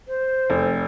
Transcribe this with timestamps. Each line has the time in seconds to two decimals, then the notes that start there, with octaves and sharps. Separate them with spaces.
0.08 C5
0.50 F1